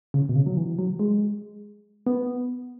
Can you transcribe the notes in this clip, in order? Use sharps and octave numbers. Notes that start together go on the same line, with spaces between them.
C#3
B2
C#3
F#3
E3
F#3
G#3
B3